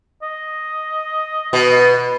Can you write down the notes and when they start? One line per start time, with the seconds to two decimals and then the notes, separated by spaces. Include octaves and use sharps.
0.22 D#5
1.53 B2